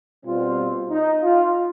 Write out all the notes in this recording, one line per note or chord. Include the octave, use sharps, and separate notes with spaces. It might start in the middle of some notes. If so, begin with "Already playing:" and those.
B2 G3 C4 F4
D#4
F4